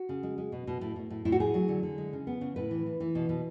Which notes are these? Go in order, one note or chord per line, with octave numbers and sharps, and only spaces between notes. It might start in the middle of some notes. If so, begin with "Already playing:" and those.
Already playing: F#4
C#3
G#3
G#3
B2
B2
A2
A2
A2
A2 E4
F#4
A3 G#4
F#3
D3
D3
G#3
C#3
B3
C#3
A2 B4
E3
E3
E3
B2
B2